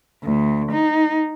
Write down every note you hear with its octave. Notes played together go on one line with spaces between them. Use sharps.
D2
D#4